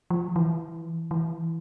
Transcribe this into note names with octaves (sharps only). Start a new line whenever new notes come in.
F3
E3
E3